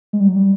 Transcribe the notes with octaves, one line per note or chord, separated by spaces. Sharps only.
G#3
G3
F#3
G3